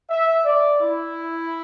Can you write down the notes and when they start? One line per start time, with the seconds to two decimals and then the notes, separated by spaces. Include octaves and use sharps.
0.10 E5
0.45 D5
0.80 E4